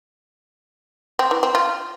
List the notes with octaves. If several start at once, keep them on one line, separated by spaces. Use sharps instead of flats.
C4
E3
C4
F4